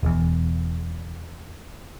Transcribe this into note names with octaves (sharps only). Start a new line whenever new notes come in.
E1 E2